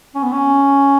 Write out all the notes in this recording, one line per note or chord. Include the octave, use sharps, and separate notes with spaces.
C#4
B3
C#4